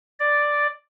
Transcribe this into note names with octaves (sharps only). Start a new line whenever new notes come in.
D5